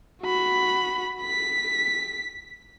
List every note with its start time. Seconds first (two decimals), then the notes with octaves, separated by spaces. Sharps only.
0.22 F#4 B5
1.22 B6